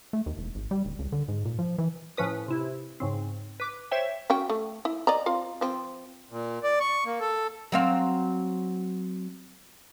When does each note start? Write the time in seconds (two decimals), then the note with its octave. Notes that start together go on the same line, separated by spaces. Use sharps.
0.13 A3
0.26 D#2
0.38 E1
0.55 G#1
0.71 G3
0.85 D1
0.99 C#2
1.12 D3
1.28 G#2
1.45 A#2
1.59 F3
1.78 E3
2.17 A2 F3 C#4 B4 D#6
2.48 C3 E4
3.00 G#2 C#3 C4
3.60 B4 D6
3.91 C5 C#5 E5 G5
4.30 C#4 F#4 G5
4.49 A3
4.85 E4
5.07 D5 D#5 A#5
5.26 C4 F4 F5
5.61 F3 C4
6.31 A#2
6.63 D5
6.80 C#6
7.06 A#3
7.20 A4
7.72 F#3 C4 F5